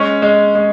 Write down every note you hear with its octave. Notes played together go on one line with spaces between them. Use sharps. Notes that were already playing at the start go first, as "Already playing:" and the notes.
Already playing: G#3 C#4
G#3
G#3